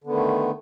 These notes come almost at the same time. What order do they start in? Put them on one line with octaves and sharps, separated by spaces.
D3 B3 D#3 A3